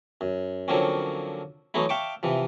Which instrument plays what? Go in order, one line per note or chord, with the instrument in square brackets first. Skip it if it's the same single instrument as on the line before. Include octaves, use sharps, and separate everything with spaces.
[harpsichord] F#2
D3 F3 F#3 A#3 C4 C#4
E3 F#3 A3 D#4 E4
E5 F5 G5 A5 C#6 D6
C3 E3 F3